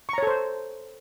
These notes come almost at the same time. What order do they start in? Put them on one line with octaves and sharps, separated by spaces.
C#6 A#5 C#5 A4 C5